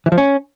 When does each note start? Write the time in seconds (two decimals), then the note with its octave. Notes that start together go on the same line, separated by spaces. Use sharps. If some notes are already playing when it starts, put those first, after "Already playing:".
0.06 E3
0.12 F3
0.18 C#4